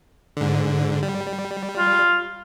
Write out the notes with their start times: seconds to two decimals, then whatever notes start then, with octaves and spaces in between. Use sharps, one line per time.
0.37 G#2 D3
1.03 G3
1.78 F4